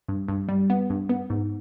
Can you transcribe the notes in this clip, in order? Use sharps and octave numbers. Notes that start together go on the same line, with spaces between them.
G2
G2
G3
B3
G2
B3
G#2